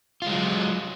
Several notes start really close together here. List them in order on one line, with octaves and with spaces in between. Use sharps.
F4 G#3 F#3